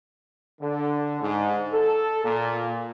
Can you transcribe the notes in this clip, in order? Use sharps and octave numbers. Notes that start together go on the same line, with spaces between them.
D3
G#2
A4
A#2